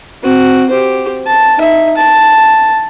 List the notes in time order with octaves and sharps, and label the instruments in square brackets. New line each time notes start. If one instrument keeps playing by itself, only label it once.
[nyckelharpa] C4 F#4
G4 C5
A5
D#4 E5
A5